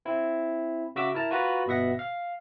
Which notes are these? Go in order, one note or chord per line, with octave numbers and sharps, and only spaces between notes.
C4 E4
C#3 F#4 E5 D6 E6
E4 A#4 A5 A#5
F4 F#4 B4 A#5
G1 B2 B3 E5 F#5 A#6
F5